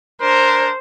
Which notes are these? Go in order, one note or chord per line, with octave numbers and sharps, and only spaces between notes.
D4 A#4 C5